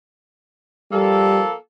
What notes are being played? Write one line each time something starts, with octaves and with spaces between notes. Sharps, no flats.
F3 G3 A#3 A4